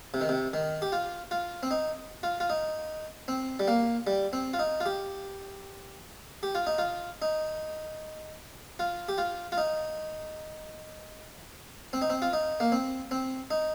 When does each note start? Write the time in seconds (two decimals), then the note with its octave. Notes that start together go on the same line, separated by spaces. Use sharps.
0.14 C3
0.21 D#3
0.29 C3
0.54 D#3
0.82 G4
0.92 F4
1.31 F4
1.63 C4
1.71 D#4
2.23 F4
2.40 F4
2.50 D#4
3.28 C4
3.60 G3
3.68 A#3
4.07 G3
4.33 C4
4.54 F4
4.59 D#4
4.80 F4
4.86 G4
6.43 G4
6.55 F4
6.67 D#4
6.78 F4
7.22 D#4
8.79 F4
9.09 G4
9.18 F4
9.52 F4
9.58 D#4
11.93 C4
12.02 D#4
12.10 C4
12.22 F4
12.33 D#4
12.60 A#3
12.72 C4
13.11 C4
13.51 D#4